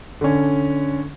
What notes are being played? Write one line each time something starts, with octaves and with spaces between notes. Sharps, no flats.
D3 C#4